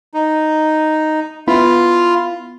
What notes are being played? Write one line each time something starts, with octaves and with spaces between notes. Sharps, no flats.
D#4
B3 E4 F4 B5